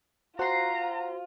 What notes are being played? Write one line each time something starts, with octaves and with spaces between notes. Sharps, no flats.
F4 F#4 C5 F#5 A#5 C6